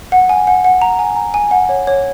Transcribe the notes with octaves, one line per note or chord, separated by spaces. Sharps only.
F#5
G#5
F#5
F#5
A#5
G#5
A#5
G#5
F#5
C#5
C#5